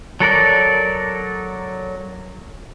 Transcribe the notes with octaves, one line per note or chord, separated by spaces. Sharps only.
F#3 A4 A#4 D5